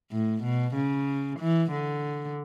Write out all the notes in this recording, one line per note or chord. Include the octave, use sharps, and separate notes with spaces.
A2
B2
C#3
E3
D3